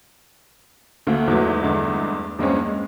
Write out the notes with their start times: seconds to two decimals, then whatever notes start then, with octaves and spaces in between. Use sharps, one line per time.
1.07 D2 A3 A#3
1.27 E2 G#2 F#3 A3 B3
1.63 E2 G2 D3 G#3 A3
2.39 E2 G2 G#3 A#3 C4 C#4
2.65 G#3